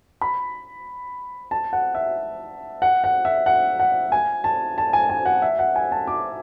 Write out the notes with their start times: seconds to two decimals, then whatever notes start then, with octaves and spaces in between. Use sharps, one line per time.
0.21 B5
1.51 A5
1.73 F#5
1.95 E5
2.82 F#5
3.04 F#5
3.25 E5
3.46 F#5
3.80 F#5
4.12 G#5
4.44 A5
4.78 A5
4.93 G#5
5.09 G#5
5.25 F#5
5.42 E5
5.59 F#5
5.76 G#5
5.92 A5
6.07 D6